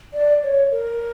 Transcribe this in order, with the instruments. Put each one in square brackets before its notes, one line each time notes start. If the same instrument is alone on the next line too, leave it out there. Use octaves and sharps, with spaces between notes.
[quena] D5
C#5
A#4